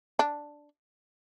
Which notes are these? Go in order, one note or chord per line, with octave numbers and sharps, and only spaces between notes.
D4